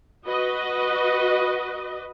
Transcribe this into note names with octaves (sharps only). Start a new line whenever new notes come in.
F#4 B4 D#5